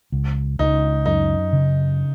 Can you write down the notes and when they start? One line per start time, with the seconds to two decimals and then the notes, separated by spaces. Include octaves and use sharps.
0.12 C#2
0.59 C#2 D#4
1.06 F#2 D#4
1.53 C#3